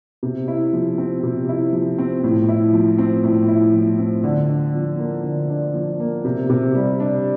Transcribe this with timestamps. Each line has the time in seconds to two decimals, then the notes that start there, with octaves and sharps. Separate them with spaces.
0.23 C3
0.48 E4
0.73 F3
0.98 C4
1.23 C3
1.49 E4
1.73 F3
1.98 C4
2.24 A2
2.49 E4
2.73 F3
2.98 C4
3.24 A2
3.48 E4
3.73 F3
3.99 C4
4.24 D3
4.49 D4
4.74 F3
4.99 A#3
5.24 D3
5.50 D4
5.74 F3
6.00 A#3
6.25 C3
6.49 C3
6.75 G3
7.00 D4